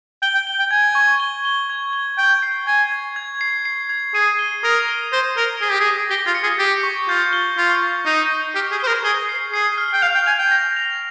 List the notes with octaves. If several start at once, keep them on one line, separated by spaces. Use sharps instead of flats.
G5 G7
G5
G7
G5
G#5 G#6
C#6
G7
G7
G#6
G7
G5 G#6
C7
G#5 G#6
G#6
G#6
C7
C7
G#6
G#4 D#7
G7
A#4 D#6
G7
C5 A#6
A#4 G7
G#4 G7
G4
G#4
A#6
G4 G7
F4
C#7
G#4
G4 C#7
C#6
F4 G6
G7
F4 C#6
C#6
D#4 C7
G7
G4 F6
G#4
C5 G7
A#4
G#4 G7
C7
G#4 C7
F6
G5
F5 F7
G5
G#5 F7
G5
A#6
F7